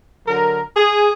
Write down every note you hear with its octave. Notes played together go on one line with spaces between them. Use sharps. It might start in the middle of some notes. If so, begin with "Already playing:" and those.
D3 F#3 A#4
G#4